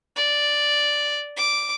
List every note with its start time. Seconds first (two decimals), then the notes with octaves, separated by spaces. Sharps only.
0.16 D5
1.37 D6